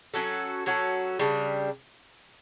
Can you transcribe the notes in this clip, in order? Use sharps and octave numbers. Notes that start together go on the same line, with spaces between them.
F#3 C#4 F#4 A4
F#3 C#4 F#4 A4
C#3 G3 D4